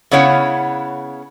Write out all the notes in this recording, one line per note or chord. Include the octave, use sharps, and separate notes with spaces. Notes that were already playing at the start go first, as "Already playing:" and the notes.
C#3 B3 E4 C#5 F5 F#5